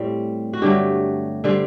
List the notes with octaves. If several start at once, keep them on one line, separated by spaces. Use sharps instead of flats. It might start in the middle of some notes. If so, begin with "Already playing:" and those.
Already playing: A2 G3 C4
F#4
G2 D3 F#3 A3 G4
D3 G3 C4